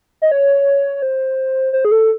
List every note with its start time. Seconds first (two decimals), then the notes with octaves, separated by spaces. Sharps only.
0.22 D#5
0.31 C#5
1.02 C5
1.73 C5
1.85 G#4
1.92 A4